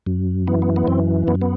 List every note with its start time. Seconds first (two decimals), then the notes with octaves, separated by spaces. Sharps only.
0.06 F#2
0.47 E3 B3
0.62 B3
0.76 B3
0.87 F#2 C4
1.28 F#2 B3
1.41 B3